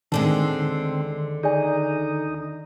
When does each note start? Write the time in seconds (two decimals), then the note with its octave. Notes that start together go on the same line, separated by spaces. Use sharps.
0.12 D#2 D3 D#3 G#3 C4 A5
1.43 D#4 G#4 D5 G#5